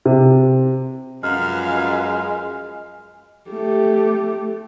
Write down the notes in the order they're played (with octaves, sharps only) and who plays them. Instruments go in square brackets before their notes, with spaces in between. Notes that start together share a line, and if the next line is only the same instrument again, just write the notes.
[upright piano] C3
[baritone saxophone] F#2 [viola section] F3 B4 F5 [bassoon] G#3 [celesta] F6
[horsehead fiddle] A3 G4